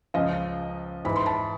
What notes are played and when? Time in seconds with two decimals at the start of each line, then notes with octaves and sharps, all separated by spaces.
0.14 C#2 C#3 F3 D#5 F5
1.05 G#2 E3 B5
1.16 C6
1.26 A5 B5